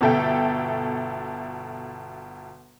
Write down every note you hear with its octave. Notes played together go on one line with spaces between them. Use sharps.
G1 B2 A4 E5 G5